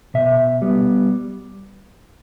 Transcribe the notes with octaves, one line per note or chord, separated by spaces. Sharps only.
B2 E5
G3 B3